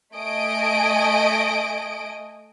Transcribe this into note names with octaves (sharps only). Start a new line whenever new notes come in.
A3 D#5 G#5 D#6 D7